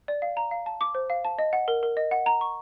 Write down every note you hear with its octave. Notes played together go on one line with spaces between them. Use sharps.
D5
F5
A#5
F5
A5
D6
C5
F5
A5
D#5
F#5
A#4
A#4
D#5
F#5
A#5
C#6